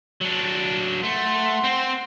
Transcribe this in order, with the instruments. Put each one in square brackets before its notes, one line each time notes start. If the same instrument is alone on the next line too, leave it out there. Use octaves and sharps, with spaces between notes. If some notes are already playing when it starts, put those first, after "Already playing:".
[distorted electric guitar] F#3 D4
[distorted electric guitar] A3 [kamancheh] F#5 C6
[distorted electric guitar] C4